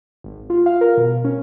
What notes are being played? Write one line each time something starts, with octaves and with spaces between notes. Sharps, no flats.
G#1
F4
F5
A#4
B2
C#4